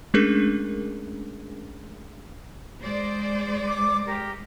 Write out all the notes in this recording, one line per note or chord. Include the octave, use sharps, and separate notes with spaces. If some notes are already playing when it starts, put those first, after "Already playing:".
G#3 A3 C#4 D4 G#4 A#4
G#3 C5 D5
D6
G#3 G4 A#4